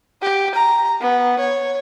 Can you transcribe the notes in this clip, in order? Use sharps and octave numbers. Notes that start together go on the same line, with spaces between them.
G4
A#5
B3
C#5